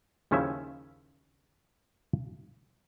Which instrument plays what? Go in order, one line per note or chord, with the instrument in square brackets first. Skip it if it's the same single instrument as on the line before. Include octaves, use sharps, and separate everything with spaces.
[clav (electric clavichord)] D#2 C#3 F3 C#4 E4 E5